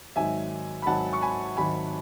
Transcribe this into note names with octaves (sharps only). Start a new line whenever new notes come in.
G#1 G#2 D#3 F#3 E5 G#5
B5
G#1 G#2 D#3 F#3 F#5 A5
C#6
G#5 B5
G#1 G#2 D#3 F#3 G#5 B5